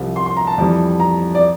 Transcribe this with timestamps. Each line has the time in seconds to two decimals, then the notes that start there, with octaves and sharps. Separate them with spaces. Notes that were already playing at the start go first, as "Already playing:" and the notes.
Already playing: C2 C3 F3
0.16 C6
0.26 C6
0.37 A#5
0.47 A5
0.58 F2 E3 G3
1.00 A#5
1.35 D5